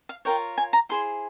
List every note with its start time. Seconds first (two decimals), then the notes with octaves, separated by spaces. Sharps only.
0.09 F5
0.25 F4 A#4 C#5 G5
0.58 G#5
0.73 A#5
0.89 E4 G#4 C5 C6